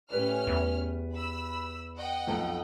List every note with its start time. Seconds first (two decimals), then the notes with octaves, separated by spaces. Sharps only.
0.10 A2 C#4 G4 B4 D5 F6
0.47 E2
1.12 B5 E6
1.97 D#5 F#5 G5
2.27 B1 F2 F5